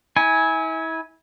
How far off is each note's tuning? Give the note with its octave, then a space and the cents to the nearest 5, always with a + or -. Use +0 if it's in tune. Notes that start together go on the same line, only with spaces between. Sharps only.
E4 -35 G#5 +0